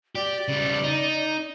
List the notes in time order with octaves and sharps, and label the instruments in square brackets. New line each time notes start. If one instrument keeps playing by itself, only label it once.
[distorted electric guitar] G4 [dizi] D5
[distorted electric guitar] C#3 G3
D#4